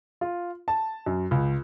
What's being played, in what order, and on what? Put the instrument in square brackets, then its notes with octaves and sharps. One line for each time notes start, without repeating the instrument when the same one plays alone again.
[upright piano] F4
A5
F#2
C#2